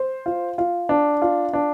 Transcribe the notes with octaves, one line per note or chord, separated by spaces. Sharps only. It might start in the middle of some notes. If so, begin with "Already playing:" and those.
Already playing: C5
F4
F4
D4
F4
D4